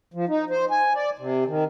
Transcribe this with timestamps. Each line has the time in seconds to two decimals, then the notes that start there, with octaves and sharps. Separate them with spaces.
0.14 F3
0.28 D#4
0.50 C5
0.71 G#5
0.95 D5
1.18 C3
1.47 D#3